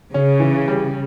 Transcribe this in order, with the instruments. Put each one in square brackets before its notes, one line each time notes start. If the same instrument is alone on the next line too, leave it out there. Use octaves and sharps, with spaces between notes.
[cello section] C#3 [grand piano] C#4
[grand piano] E3
G3